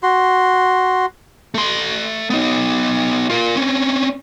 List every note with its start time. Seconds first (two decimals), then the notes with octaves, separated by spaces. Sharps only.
0.03 F#4 C6
1.54 A3 C6
2.30 B3 D#4
3.30 F4 A#4
3.55 C4 C#4